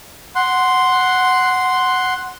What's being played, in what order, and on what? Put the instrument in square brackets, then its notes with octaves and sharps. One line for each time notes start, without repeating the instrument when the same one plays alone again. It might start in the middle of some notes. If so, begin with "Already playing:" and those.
[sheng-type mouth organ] F#5 C6